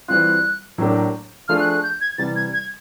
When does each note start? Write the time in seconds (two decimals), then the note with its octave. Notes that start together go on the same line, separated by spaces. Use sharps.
0.08 E3 G3 C4 F4 F#6
0.78 A2 F#3 A#3 D4 G4
1.48 F3 A3 D4 F4 G#4 F6
1.60 F#6
1.71 F#6
1.83 G6
2.01 G#6
2.18 C3 E3 G3 A6
2.36 G#6
2.53 G#6